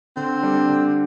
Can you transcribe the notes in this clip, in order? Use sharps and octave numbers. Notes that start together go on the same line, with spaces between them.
D3 C4
G3 D4 A4
D3